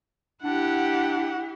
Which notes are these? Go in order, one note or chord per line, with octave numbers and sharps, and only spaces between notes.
D4 E4 G4 F#5